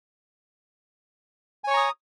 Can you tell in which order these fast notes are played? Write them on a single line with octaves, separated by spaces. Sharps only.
G#5 C#5 C#6 A#5 D#6